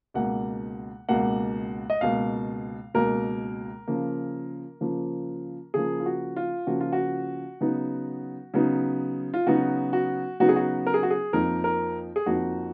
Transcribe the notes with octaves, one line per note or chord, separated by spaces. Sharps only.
C#2 B2 A#3 F#5
C#2 B2 A#3 F#5
D#5
C#2 B2 A#3 F5
C#2 B2 A#3 A#4
C#3 F3 A#3
C#3 F3 A#3
C#3 F3 A#3 G#4
F4
F#4
F4
C#3 F3 A#3 F#4
F4
F#4
C#3 F#3 B3 D#4
C#3 F#3 B3 D#4
F4
C#3 F#3 B3 D#4 F#4
F#4
C#3 F#3 B3 D#4 F#4
G#4
F#4
A#4
G#4
F#4
G#4
F2 F3 A#3 D#4 A#4
A#4
G#4
F2 F3 A#3 D#4 F#4